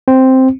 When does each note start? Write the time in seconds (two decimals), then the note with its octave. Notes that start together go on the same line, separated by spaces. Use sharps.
0.08 C4